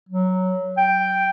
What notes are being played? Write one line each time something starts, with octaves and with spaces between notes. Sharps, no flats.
F#3
G5